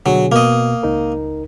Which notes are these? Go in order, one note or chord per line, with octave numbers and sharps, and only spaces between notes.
B2 D3 F#3 G#4
B2 A#3 D#5
C#2 D#4 A#4